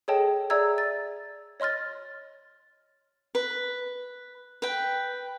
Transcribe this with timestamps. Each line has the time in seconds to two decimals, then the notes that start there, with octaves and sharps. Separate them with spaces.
0.08 G#4 A4 C#5 D#5 G5 A5
0.50 G#4 D5 E5 A#5 E6 G#6
0.78 A6
1.60 C#5 D#5 C6 F6 A6
3.35 B4
4.62 B4 G5